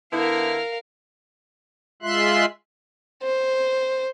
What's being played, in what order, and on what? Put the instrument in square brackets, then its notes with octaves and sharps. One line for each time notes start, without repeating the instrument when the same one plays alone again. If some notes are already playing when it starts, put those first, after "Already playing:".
[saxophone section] D3 B3 E4 [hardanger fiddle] A#4 F5
[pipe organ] G#3 F4 E5 C6 F#6
[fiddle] C5